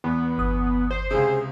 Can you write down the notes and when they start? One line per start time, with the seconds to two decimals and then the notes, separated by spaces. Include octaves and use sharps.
0.04 E2 B3
0.38 G1 D#6
0.91 C5
1.11 C#2 C3 G#4